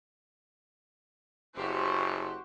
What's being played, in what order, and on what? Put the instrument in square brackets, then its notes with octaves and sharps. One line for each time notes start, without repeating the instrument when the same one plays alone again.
[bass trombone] F#1 [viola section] F#4 G4 C5